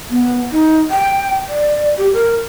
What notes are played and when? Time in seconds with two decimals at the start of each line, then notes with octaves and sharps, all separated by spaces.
0.10 B3
0.52 D#4
0.91 G5
1.49 D5
1.98 G4
2.13 A#4